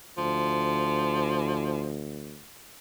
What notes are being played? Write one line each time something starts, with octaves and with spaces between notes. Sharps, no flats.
D2 F3